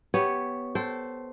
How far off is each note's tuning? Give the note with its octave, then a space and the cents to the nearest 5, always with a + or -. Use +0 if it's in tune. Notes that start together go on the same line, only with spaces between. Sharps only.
B3 +0 G4 +0 C#5 +0
A4 +0 C5 +0 G5 -35